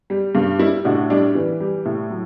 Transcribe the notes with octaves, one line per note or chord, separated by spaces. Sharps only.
G3
G2
G3 E4
A2 D4 F#4
G3 D4
E3
G3
A2
F#3